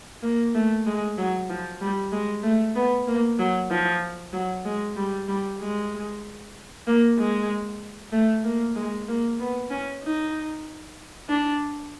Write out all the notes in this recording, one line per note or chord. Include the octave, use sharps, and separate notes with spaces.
A#3
A3
G#3
F#3
F3
G3
G#3
A3
B3
A#3
F#3
F3
F#3
G#3
G3
G3
G#3
A#3
G#3
A3
A#3
G#3
A#3
B3
C#4
D#4
D4